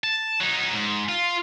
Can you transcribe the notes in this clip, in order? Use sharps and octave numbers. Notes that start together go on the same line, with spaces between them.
A5
F#3 D#4
G#2
F4